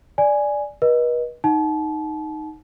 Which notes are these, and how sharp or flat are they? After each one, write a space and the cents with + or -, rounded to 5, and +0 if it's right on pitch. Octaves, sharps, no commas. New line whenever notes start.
D5 +0 G#5 +0
B4 -40 D#5 +0
D#4 +0 F#5 +0 A5 -35